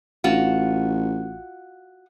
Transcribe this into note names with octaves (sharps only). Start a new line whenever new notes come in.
A1 F4 F#4